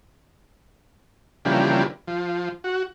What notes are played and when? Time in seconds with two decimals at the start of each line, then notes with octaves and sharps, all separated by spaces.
1.45 C#3 E3 F3 G3 A#3 D4
2.07 F3
2.64 F#4